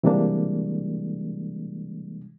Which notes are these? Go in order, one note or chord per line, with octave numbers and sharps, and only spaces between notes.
C3 E3 G3 G#3 A#3 D4